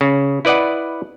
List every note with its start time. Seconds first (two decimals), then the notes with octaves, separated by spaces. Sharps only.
0.01 C#3
0.45 E4 B4 D5 D#5 F#5